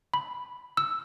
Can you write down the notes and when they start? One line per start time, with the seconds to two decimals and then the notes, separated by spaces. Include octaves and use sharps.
0.14 B5
0.77 E6